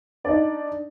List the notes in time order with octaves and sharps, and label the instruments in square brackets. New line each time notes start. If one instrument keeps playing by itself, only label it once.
[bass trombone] D4 [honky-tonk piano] D#4 D5